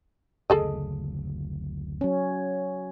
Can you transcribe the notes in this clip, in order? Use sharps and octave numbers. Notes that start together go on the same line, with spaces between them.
F#1 D2 C#3 G#4 A4 D#5
F#3 C#4